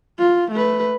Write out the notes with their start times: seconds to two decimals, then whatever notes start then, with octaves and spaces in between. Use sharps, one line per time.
0.19 F4
0.51 A3 B4